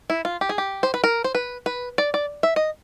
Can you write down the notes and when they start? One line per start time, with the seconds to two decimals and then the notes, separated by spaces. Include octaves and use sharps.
0.10 E4
0.25 F4
0.41 G4
0.49 G#4
0.58 G4
0.83 C5
0.94 B4
1.04 A#4
1.24 C5
1.35 B4
1.66 B4
1.98 D5
2.14 D5
2.43 E5
2.56 D#5